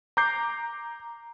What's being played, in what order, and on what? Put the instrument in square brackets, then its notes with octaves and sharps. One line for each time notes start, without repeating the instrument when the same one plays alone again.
[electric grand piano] A#5 D6 G6 C7